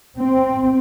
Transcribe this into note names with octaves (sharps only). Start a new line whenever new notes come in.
C4